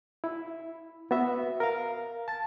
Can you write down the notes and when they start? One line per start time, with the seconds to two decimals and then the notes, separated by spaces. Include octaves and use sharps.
0.24 E4
1.11 B3 F#4 E5
1.60 A#4 F5
2.28 A5 A6